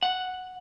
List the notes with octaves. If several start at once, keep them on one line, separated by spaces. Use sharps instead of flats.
F#5